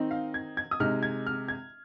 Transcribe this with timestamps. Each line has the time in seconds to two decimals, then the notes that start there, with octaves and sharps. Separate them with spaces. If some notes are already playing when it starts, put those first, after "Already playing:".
Already playing: D#3 C4 D#4
0.11 F5
0.34 G#6
0.57 G#6
0.71 D#6
0.80 C3 G#3 D#4 F6
1.03 G#6
1.26 F6
1.48 G#6